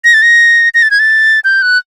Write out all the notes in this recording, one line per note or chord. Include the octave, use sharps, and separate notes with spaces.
A#6
A6
A#6
A#6
A6
G#6
A6
G6
F#6